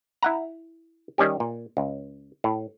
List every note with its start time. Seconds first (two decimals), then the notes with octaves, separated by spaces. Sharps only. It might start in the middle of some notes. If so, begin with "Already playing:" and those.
0.22 E4 F#5 A#5
1.18 D#3 G3 C#4 G4
1.40 A#2
1.77 C#2
2.44 A2